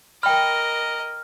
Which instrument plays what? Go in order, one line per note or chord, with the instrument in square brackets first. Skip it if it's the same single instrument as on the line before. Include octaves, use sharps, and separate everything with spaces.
[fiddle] A#4 D#5 [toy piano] G5 B5 [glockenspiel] F6